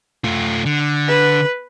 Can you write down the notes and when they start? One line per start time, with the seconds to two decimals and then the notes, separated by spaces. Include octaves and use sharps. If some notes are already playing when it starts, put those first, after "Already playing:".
0.24 A3 F4
0.65 D3
1.08 B4